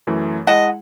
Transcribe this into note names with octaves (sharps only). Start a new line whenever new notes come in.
F#2 E3 A3
G#3 E4 D#5 F#5 A5